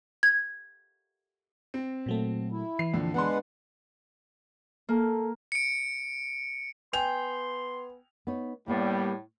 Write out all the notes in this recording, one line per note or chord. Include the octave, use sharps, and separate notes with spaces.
G#6
C4
A#2 F#3 A3
E4
E3 C7
F2 A#2 D3
G#3 B3 D4 B4 F#5 C6
A#3 A4
C#7 D7
B3 G5 G#5 C6 F7
B3 D#4 C#5
A2 G3 A#3 B3